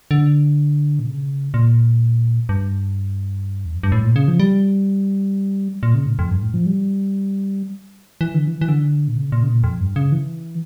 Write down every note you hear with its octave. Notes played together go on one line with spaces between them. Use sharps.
D3
A#2
C#3
A#2
G2
E2
F2
G2
A2
A#2
C#3
F3
G3
A#2
C#3
A2
F2
G2
A2
F3
G3
E3
D3
E3
E3
D3
A#2
C#3
A#2
C#3
A#2
F2
G2
C#3
E3